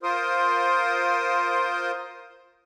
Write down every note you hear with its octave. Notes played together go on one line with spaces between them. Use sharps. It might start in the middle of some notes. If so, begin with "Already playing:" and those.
F4 A#4 C5 C6 D#6